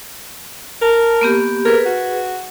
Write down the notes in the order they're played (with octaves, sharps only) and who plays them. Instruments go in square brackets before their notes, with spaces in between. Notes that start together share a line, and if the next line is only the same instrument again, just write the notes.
[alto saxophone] A#4 [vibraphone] A5
[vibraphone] A#3 B3 G4
[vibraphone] G#4 B4 [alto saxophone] A#4
[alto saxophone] F#4